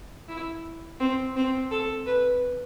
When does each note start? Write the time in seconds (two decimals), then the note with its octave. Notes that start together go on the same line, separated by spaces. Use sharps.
0.29 E4
1.00 C4
1.36 C4
1.71 A4
2.06 B4